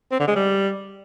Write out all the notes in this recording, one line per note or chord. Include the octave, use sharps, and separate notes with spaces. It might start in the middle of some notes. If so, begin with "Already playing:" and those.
C4
D3
G#3
G3